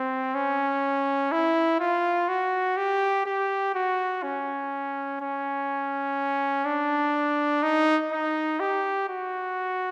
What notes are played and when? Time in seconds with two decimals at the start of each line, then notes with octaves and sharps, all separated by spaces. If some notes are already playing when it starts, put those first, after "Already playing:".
Already playing: C4
0.35 C#4
1.32 E4
1.80 F4
2.29 F#4
2.77 G4
3.26 G4
3.74 F#4
4.23 C#4
5.20 C#4
6.65 D4
7.63 D#4
8.12 D#4
8.60 G4
9.09 F#4